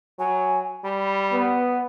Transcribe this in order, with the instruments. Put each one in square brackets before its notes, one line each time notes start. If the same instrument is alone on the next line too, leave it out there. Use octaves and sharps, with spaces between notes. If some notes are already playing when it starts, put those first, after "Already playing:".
[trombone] F#3 [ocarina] G#5
[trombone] G3 [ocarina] B5
[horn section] B3